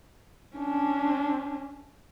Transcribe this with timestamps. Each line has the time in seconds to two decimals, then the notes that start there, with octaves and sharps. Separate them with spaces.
0.56 C#4 D4